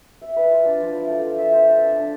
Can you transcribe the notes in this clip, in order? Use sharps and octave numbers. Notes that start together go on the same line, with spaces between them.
E5
B4
F4
D4
F3
E4
A3
F3
E5
C5
A4
D4
D4